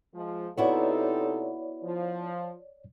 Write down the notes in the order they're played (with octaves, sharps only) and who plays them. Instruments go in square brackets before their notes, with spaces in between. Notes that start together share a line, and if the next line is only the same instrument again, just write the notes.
[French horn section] F3 G#3
[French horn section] C3 D#4 A4 [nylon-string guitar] B3 E4 F#4 [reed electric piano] C#5 D5
[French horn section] F3